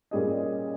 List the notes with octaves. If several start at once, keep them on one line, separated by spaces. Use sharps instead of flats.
A#2 G3 C#4 G#4 D#5